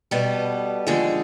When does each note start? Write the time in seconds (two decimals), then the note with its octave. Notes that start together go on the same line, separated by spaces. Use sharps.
0.11 B2 G3 B3 A4
0.87 D#2 D3 F3 G#3 G#4